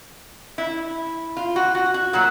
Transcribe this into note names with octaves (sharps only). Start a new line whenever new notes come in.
E4
F4
F#4
F#4
F#4
A#2 F#3 F#4